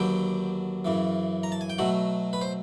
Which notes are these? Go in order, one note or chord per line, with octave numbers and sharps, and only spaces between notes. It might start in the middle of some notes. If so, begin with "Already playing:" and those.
Already playing: D#2 D3 F#3 B3 G5
F#2 C#3 E3
A#5
A5
G#5
G5
B2 F#3 A3 F#5
B4
C5